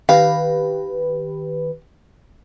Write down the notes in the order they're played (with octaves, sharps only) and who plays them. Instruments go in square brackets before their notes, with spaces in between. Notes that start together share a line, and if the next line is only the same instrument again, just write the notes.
[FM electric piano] D#3 G4 B4 [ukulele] F5